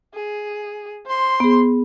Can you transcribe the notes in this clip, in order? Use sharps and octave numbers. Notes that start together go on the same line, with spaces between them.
G#4
C5 C6
B3 G#4